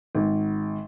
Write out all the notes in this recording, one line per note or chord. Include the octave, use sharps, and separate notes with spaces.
G#1